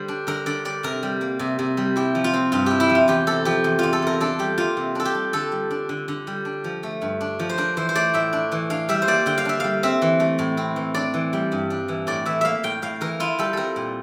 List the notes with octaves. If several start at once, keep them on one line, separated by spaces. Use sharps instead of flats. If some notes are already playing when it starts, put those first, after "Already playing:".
Already playing: D3 G3 C5
D4
D3 A#4
D3 D5
G3 D5
C3 A#4
G3
A#3
C3
C3
G3
E4 G4
F3
F4
C4
G2 F4
E4 G4
E4
F3
F4
E2 G4
C3 A4
F3 G4
E2
E2 F4
A4
C3 A#4
D4 A4
G3 G4
A#3 F4
C3
D4 A4
G4
G3
D3 A4
G3
D4
D3
D3
G3
D4
F3
A3
G2
D4
F3
C5
D4 A#4
E3 C5
C5
A3 D5
A2 E5
D4
E3
D4 F5
G3 E5
C5
A#3 D5
D3 G5
F5
D4 E5
G3 F5
C4 E5
E3
A3
A2
C4
E3
D4 D5
E3
G3
G2
D4
E3
A2 D5
E3 E5
A#3 E5 F5
A2 G5
A2 F5
E3 A#4
E4 F4
G3 A4
C4 A4 A#4
A#2